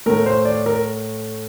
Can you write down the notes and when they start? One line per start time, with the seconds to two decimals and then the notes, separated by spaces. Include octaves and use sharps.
0.06 A2 A3 A#4
0.26 C5
0.45 D5
0.66 A#4